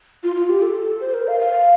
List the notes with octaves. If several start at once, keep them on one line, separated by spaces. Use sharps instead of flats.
F4
F4
G4
A4
C5
A#4
F5
F5